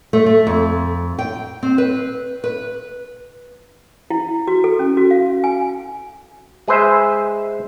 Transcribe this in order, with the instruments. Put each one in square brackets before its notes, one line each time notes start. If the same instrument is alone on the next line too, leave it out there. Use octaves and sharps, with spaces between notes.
[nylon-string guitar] A3
A3
F2
G5
C4
B4
B4
[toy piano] E4
F#4
A4
C#4
F#4
F5
G#5
[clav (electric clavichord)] G#3 G#4 B4 C5 E5